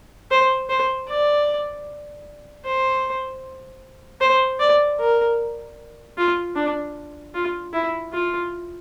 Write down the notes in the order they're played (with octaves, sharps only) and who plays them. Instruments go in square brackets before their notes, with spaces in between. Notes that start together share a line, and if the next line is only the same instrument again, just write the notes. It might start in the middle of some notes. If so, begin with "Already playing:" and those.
[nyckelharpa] C5
C5
D5
C5
C5
D5
A#4
F4
D4
F4
E4
F4